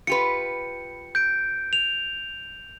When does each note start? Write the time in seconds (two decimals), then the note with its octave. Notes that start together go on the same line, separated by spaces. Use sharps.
0.07 F4 G4 B4 C#7
1.15 G6 D7
1.73 F7